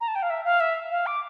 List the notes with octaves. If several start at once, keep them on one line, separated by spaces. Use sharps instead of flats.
A#5
A5
G5
F5
E5
F5
E5
F5
D6